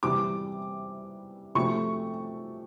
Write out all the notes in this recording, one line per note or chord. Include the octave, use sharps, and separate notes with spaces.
C3 E3 G3 D6
C3 F3 A3 C#6